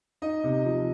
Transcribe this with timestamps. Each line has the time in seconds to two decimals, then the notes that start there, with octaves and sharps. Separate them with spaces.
0.22 D#4 D#5
0.44 C3
0.65 F3